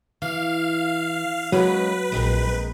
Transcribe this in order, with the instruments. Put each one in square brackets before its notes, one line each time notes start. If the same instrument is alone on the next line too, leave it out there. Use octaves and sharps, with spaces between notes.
[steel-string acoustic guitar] E3 [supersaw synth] F5
[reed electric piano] F#3 [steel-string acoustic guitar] G#3 A#3 C#4 [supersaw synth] B4
[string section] A#1 [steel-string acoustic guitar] G#3 C4 A#4